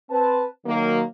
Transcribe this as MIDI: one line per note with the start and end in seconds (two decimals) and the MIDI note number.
0.11 0.45 60
0.11 0.45 71
0.11 0.45 81
0.66 1.02 51
0.66 1.02 54
0.66 1.02 58